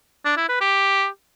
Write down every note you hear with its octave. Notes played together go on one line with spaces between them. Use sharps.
D4
E4
B4
G4